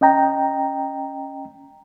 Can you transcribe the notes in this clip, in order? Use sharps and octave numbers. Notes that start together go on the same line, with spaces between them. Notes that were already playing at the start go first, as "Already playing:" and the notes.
C#4 D#5 G5 A#5